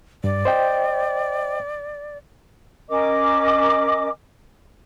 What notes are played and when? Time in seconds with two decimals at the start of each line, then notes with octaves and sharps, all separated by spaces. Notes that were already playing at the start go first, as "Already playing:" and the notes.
0.24 G2 D5
0.45 C5 D#5 G5
2.89 C#4 A#4 D#5 D6